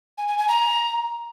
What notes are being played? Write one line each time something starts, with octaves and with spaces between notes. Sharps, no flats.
G#5
G#5
G#5
A#5